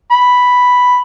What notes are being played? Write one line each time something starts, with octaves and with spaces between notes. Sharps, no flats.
B5